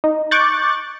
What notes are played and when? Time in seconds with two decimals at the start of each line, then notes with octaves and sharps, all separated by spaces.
0.04 D#4
0.31 C#6 D6 F#6 G6 A6